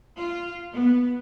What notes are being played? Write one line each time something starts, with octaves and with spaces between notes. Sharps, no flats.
F4
B3